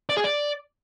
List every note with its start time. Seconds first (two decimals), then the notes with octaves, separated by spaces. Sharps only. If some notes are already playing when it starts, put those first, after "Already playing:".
0.09 D5
0.17 G#4
0.24 D5